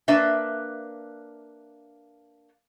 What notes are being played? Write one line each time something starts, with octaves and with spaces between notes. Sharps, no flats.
A#3 D4 B4 E5